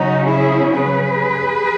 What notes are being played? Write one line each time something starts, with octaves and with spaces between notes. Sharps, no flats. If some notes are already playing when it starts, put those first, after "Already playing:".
Already playing: C#3 F#3 C#4 D#4 F#4
E4 G#4
G#4 B4